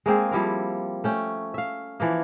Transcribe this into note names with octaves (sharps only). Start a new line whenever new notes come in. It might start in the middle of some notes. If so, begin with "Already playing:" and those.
G#3 A#3 C4 G#4
F3 G3 E4 A#4
A3 C#4 G5
E5 F5
E3 F3 A#3